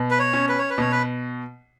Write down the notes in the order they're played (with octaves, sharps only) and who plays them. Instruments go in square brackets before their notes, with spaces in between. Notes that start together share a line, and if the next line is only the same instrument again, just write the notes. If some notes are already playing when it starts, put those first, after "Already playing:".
Already playing: [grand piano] B2
[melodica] B4
C#5
[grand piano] C#4
[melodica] B4
C#5
B4
[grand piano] B2 [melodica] C#5
[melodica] B4